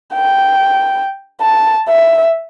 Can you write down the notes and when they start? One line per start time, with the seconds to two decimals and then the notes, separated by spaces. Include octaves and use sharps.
0.14 G5
1.41 A5
1.89 E5